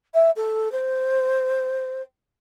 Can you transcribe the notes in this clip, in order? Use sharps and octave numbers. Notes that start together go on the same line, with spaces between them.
E5
A4
C5